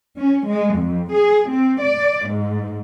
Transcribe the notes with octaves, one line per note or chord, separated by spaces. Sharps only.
C#4
G#3
F2
G#4
C4
D5
G#2